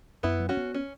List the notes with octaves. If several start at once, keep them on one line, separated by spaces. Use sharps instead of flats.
F#2 B3 E4
F#3
C#4 F#4
B3
C#4